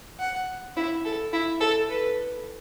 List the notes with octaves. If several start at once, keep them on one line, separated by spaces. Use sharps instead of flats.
F#5
E4
A4
E4
A4
B4